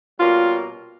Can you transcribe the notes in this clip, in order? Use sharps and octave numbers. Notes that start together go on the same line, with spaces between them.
B2 G3 A#3 C#4 F4